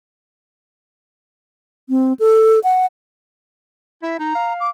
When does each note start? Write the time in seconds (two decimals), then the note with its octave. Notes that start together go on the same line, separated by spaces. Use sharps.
1.89 C4
2.19 A4
2.64 F#5
4.03 E4 E5
4.19 D#4 A#5
4.35 F5
4.60 D6